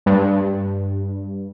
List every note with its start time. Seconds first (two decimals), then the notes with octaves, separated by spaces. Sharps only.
0.06 G2